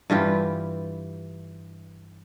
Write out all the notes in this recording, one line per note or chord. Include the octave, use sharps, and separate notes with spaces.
G2 E3 F4 G4